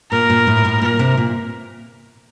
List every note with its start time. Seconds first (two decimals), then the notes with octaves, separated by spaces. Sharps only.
0.11 A#2 A#4
0.30 A#2
0.47 A2
0.65 A2
0.81 A#2 A#4
0.99 C3
1.17 A#2